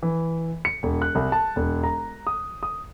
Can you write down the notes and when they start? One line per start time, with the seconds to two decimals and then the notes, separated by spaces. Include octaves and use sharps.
0.02 E3
0.65 C#7
0.83 E1
1.02 F#6
1.15 C2
1.32 A5
1.56 E1
1.84 A#5
2.27 D#6
2.63 D#6